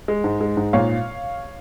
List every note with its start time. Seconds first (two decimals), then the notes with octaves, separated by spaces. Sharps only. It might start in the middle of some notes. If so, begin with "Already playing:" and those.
0.08 G#3
0.24 G#2
0.41 G#3
0.57 G#2
0.73 A#2 C#5 F5